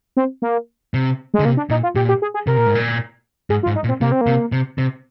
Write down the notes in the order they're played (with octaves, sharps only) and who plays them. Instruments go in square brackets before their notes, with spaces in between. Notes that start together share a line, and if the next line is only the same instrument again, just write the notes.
[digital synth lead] C4
A#3
[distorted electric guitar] C3
[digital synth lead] G#3
[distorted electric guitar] D3
[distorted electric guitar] C3 [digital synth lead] A#3
[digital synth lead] D4
[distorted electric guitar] A#2 [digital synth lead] D#4
[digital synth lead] F4
[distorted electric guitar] A#2 [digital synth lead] G4
[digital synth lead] G4
G#4
G#4
[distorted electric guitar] C3 [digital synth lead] A#4
[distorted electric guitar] A#2
G#2
A#2
[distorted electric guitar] G#2 [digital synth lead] G#4
[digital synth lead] F4
[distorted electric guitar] G#2
[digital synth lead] D#4
[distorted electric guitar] A#2
[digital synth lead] C4
[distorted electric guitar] C3 [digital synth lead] A#3
[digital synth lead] C4
A#3
[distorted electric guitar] C3
C3
C3